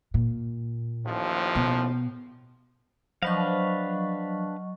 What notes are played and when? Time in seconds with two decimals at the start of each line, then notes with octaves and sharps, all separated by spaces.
0.14 A#2
1.05 A1 D#2 F3
1.55 B2
3.23 F3 F#3 D4 B4 D#5 F5 C#6